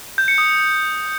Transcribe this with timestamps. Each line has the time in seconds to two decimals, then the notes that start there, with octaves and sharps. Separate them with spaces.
0.18 G6
0.28 C#7
0.38 D#6